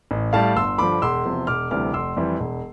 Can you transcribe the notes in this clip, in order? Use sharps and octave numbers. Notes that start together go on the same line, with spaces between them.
A1
A2 G3 F5 A5
G1 C6 E6
G2 D3 F3 B5 D6
E1 C6 E6
E2 C3 F3
E1 D6 F6
D2 C3 E3 G3 D6 F6
F1 C6 E6
F2 E3 G3
E1